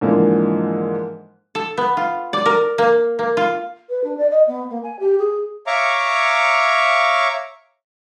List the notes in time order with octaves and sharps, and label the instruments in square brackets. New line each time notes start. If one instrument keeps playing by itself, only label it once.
[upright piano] G#2 D3 E3 F3 A#3
[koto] A4
B3
F4
D5
A#4
A#3
A#3
F4
[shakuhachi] B4
D4
D5
D#5
B3
A#3
G#5
G4
G#4
[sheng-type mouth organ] C#5 E5 F5 A#5 C#6 D6